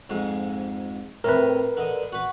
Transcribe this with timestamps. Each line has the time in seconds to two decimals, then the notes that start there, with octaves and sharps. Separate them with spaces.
0.10 F2 G#2 G#3
1.24 A2 C3 A#4 B4
1.77 D3 D#5
2.12 F#4 B4